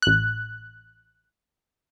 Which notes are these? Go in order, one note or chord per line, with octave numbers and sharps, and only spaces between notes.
A1 F#6